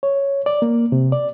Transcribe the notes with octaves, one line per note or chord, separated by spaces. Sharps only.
C#5
D5
A#3
C3
D5